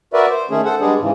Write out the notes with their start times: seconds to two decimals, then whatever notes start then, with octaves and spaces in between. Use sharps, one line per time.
0.13 F#4 A#4 B4 D5 E5
0.30 C5
0.50 D#3 A3 C#4 G#4
0.65 A4 C5 F#5
0.81 G3 G#3 B3 D4 G#4
1.01 G#2 C#3 E3